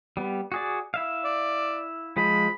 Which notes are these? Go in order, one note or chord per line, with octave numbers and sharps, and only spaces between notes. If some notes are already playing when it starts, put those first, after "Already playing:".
G3 B3
F#4 G#4 D5
E4 E5 F5
D5
F3 G#3 B5